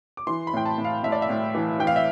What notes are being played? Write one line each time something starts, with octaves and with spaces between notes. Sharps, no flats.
D6
E3 C6
B5
A2 G5
A5
A2
F5
A2 E5
D5
E5
A2
E3
E3 G5
F5
E5